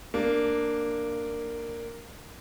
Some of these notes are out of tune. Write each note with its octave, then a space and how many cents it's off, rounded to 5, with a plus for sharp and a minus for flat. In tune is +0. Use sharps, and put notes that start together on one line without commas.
A#3 -10 D4 +0